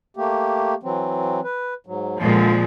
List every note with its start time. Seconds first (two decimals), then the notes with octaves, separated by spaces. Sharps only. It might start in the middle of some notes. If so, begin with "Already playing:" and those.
0.17 A3 A#3 G4
0.83 E3 F#3 C4
1.44 B4
1.86 G#2 F#3
2.20 A#2 D3 F3 G#3